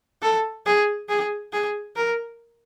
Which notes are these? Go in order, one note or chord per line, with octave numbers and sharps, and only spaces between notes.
A4
G#4
G#4
G#4
A#4